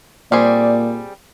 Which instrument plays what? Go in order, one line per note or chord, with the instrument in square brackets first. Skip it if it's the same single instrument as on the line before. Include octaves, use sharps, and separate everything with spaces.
[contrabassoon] A#2 [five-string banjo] G3 C4 G#4 [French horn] D5